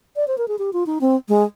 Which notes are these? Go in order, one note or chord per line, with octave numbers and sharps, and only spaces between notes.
D5
C5
A#4
G#4
G4
F4
D#4
C4
G#3